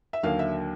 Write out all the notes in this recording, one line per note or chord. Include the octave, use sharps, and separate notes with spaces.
E5
D#2 D3 F#3 A#3 F5
E5